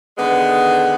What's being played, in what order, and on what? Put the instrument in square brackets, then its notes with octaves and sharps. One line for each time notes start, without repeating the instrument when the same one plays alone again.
[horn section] D3 D#3 G#3 B3